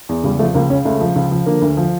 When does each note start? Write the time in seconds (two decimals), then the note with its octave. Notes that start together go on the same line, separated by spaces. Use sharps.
0.09 E2
0.24 C#2 G3
0.39 F3 A3
0.54 C#2 A#3
0.70 C#3 C#4
0.85 C#2 A3
1.00 F3
1.16 C#2
1.31 F3
1.46 D3 A#3
1.62 D2
1.77 F3